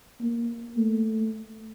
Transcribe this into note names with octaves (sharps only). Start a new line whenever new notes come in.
A#3
A3